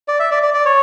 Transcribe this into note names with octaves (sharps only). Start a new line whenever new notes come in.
D5
E5
D5
D5
D5
C#5